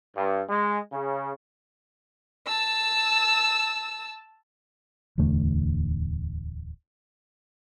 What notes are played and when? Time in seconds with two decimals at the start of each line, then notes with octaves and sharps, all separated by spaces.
0.16 G2
0.48 G#3
0.92 C#3
2.47 A5 E6
5.18 D1 E2 D3 A3